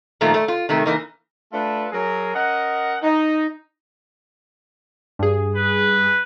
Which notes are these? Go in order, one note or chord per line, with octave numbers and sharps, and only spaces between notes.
A#2 D#3 F3 A3
A3
F4
C3 D#3 A3
E3 A#3 D#4
A3 D4 F4 A4 B4
F#3 G#4 A#4
C#4 A#4 D#5 F#5
D#4
G2 G#4
B4